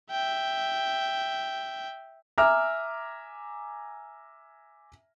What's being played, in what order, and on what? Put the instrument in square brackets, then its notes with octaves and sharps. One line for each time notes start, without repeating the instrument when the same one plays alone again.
[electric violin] E5 G5
[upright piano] E5 G#5 A#5 D6 F6